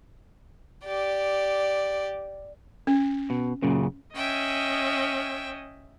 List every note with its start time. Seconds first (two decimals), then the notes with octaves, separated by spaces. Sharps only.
0.85 G4 D5
2.87 C#4
3.30 B2
3.63 F#2 A#2 C#3
4.15 C#4 D#5 E5 G5